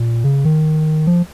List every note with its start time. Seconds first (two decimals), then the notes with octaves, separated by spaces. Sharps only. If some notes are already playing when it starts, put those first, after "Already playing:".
Already playing: A#2
0.24 C#3
0.45 D#3
1.07 F3